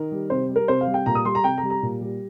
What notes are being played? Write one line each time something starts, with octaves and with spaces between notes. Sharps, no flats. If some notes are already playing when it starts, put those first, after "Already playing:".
Already playing: D#3 A#4
G3
C3 C5
G3
A#4
C3 C5
F5
G3
G5
A#2 A#5
D#6
G3 C6
A#5
C3 G5
A#5
G3
A#5
A#2
G3